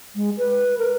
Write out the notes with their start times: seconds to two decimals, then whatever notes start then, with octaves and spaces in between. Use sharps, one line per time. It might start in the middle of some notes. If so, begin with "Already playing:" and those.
0.16 G#3
0.38 B4
0.78 A#4